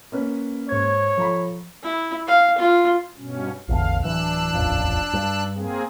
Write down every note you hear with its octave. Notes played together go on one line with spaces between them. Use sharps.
A#3 C#4 B4
G#2 C5 C#5 G#6
F3 A4 A#5 B5
E4
F5
F4
G2 B2 C#4
A1 E2 D3 F5
D1 E3 D4 E6 F#6
D#1 A1 F2
G2
A#3 C4 G#4